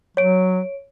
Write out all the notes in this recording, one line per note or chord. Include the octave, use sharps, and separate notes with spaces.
F#3 C#5 D7